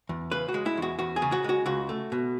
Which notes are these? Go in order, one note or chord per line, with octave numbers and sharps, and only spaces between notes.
E2
C#3 B4
F#4
G#3
E4
E2 F#4
E2 F#4
G#4
C#3
F#4
G#3 F#4
C#2 F#4
A3
B2